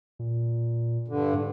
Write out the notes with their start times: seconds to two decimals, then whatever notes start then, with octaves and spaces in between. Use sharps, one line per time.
0.19 A#2
1.08 G2 D3
1.33 G#2